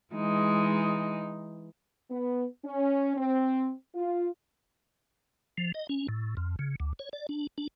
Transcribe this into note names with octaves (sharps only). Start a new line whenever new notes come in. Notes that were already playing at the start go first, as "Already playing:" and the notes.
E3 G#3 D#4
B3
C#4
C4
F4
F3
D#5
C#4
A2
F2
C#3
D2
C#5
D5
D4
D4